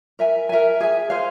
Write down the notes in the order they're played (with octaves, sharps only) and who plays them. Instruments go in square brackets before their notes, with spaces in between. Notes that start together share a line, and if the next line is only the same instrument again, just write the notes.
[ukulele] A#4 E5 G#5
A#4 E5 G#5
G#4 E5 G#5
G#4 C5 F5